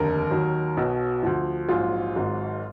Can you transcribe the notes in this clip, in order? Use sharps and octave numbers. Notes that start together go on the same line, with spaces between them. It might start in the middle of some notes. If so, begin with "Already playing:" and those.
Already playing: F1 D#2 D3 A#4
D#2 D#3 F#3
B1 B2 F#3
D2 D3 F3
A#1 G#2 F#3 F4
G#1 G#2 F#3